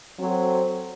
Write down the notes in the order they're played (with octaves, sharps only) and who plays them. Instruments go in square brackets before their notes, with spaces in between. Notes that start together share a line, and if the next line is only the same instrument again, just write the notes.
[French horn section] F#3 C4 F#4 A4 C5